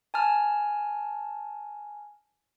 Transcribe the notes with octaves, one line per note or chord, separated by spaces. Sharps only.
G#5 A5 F6